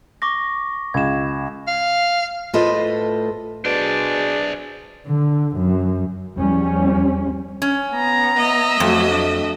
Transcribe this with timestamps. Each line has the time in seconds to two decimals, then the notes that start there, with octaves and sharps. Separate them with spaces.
0.22 C#6 D6 A#6
0.94 C#2 G#6 E7
1.68 F5
2.53 A2 F4 A4 B4 C5 D#5
3.65 B2 D4 G#4 C5 D5
5.07 D3
5.57 F#2
6.35 E2 F3 G3 C#4
7.62 C#4
7.92 B3 A#5
8.37 D#5 E5
8.80 F2 F#3 A3
9.12 D4